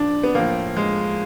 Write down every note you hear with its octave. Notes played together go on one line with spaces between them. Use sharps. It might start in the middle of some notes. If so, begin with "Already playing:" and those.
Already playing: A#2 F3 D4
B3
A2 F3 A#3
G#3